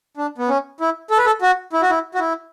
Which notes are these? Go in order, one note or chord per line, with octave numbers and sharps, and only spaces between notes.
D4
B3
C#4
E4
A4
B4
A4
F#4
E4
F#4
E4
F#4
E4